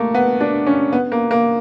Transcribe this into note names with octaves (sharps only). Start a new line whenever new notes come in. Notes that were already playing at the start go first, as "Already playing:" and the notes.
Already playing: A3 A#3
B3
D4
C#4
B3
A#3
A#3